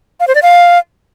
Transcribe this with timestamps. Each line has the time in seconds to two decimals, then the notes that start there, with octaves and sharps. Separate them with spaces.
0.20 F5
0.28 C5
0.35 D5
0.43 F5